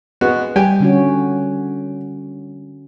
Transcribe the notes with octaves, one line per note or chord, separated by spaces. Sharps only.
G#3 B3 F#4
G3 G4 G5 G#5
D3 C#4 F#4